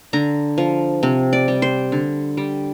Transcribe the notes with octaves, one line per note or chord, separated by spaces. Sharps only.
D3 A#5
F3
C3
D5
G3
C5
D3
G3